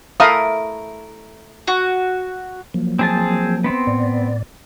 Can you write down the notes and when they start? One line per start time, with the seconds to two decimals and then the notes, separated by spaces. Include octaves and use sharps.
0.20 A3 E4 A#4 E5 F5 D#6
1.68 F#4
2.74 F3 F#3 A#3
2.99 C4 G#4 A5
3.64 B3 C4
3.87 A2 D5